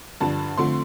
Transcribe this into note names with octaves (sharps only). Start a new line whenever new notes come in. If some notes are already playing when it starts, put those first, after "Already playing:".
G2 D3 F3 D4 A5
D3 F3 A3 C4 C6